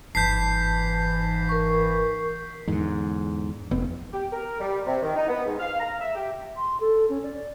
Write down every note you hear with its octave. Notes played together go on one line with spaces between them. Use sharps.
G1 G#2 E3 A5 G6 B6 C7
A#4 C#6
E2 G#2 D3
F1 B3 C4
G4
A#4
G3
C3
D#3
D#4
B3
G#2
F5
A#5
E5
G4
C6
A4
C#4
D5